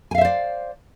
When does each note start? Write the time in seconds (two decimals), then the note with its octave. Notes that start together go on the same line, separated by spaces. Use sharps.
0.11 G#5
0.15 F5
0.18 E5
0.21 C5
0.25 D5